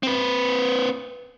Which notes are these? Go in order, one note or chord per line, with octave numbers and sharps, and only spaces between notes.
C4 B4